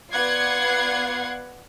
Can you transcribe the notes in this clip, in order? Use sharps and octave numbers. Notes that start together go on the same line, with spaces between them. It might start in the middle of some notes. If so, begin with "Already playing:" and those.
B3 F4 D5 F#5 G#6 C7